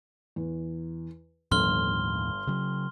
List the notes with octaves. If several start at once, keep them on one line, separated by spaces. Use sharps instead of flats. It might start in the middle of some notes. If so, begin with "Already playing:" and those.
E2
G1 D#2 A2 F3 C6 F6 G7
C#3 F#3